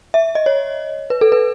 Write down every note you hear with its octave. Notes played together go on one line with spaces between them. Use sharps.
E5
D#5
C#5
B4
A4
B4